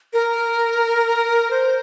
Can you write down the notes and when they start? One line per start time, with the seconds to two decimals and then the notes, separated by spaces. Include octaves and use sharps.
0.13 A#4
1.51 C5